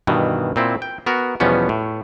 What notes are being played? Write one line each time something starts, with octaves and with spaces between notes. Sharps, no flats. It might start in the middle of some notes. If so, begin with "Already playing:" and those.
G2 B2 D#3 E3
A#2 C4 E4
G5
B3 F#4 A#4
E2 B2 F3 G3 B3 C#4
A2